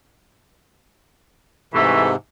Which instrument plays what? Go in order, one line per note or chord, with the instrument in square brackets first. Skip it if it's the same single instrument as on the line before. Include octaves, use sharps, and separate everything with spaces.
[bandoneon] G#2 C3 [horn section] E3 A3